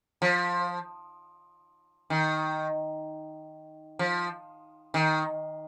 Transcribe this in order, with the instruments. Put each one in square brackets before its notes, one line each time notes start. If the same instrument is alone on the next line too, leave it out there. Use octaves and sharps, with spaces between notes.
[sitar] F3
D#3
F3
D#3